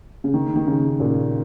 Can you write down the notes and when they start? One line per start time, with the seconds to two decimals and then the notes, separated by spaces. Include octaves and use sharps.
0.24 C#3
0.34 D#3
0.56 D#3
0.67 C#3
1.00 A#2